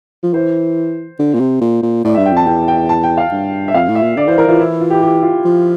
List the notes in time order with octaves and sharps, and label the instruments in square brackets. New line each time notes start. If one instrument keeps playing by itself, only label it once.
[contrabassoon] F3
[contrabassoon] E3 [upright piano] C5
[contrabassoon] D3
A#2
C3
A#2
A#2
[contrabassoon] A2 [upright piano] D5
[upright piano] E5
[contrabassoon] G2
[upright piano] G5
[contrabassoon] F2 [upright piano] A5
[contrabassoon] E2 [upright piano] G5
[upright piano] G5
A5
G5
F5
[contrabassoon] G2
[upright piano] E5
[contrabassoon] F2 [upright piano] F5
[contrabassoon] A2
[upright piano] E5
[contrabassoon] A#2
[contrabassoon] D3 [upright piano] D5
[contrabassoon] E3 [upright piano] C5
[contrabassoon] E3 [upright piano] A#4
[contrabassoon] E3 [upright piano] F4
[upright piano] E4
F4
G4
G4
F4
[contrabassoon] F3